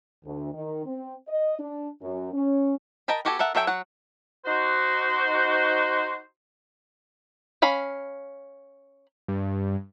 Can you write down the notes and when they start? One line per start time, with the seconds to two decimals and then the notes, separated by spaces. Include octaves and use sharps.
0.24 D2
0.53 D#3
0.86 C4
1.28 D#5
1.58 D4
2.01 F#2
2.32 C#4
3.08 A#4 D#5 G5 A5 B5
3.25 B3 F#4 G4 A4 G#5
3.39 A4 A#4 E5 F#5
3.55 F#3 A4 E5 G5 G#5
3.67 F#3 F#5
4.46 D#4 F#4 C5
7.62 C#4 F5 B5
9.28 G2